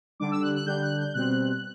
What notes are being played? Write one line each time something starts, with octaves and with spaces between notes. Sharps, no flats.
D3 G3 D4 D6
E6
F#6
F#6
D3 G3 D4 G6
F#6
G6
B2 G3 C4 F#6